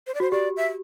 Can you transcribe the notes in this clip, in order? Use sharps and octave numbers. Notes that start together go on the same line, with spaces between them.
C5
D5
F#4 C5
G4 D5
E5